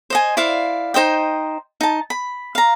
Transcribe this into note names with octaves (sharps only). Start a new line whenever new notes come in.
C5 D#5 G#5
E4 C5 D5 F5
D#4 C5 D#5 G5
D#4 A5
B5
F5 A#5